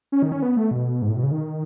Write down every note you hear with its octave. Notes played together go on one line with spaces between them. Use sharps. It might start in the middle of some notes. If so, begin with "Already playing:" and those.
C#4
D#3
C#4
B3
A3
B2
G#2
A2
B2
C#3
D#3